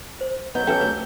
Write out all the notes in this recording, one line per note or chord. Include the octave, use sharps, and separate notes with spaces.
C5
F#3 B3 D#4 G6
F3 A3 C#4 G#4 A4 B4 G5
D2